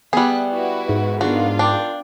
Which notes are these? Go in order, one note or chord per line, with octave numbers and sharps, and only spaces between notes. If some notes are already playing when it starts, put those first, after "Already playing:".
G3 B3 G#4 E5 F#5 F#6
E4 F#4 B4
G#2
B3 D4 F4 F#4 A#4 F5
D4 G5